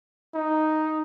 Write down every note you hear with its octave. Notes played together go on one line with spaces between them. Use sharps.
D#4